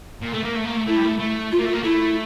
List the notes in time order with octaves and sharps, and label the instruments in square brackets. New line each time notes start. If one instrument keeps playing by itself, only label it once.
[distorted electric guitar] A#2
A3
A#3
A3
A#3
A3
[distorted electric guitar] A3 [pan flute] E4
[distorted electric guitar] G3
A3
A3
[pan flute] F4
[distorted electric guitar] A#3
[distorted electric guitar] A3 [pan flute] F4
[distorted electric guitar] A#3
[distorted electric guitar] A3 [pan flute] E4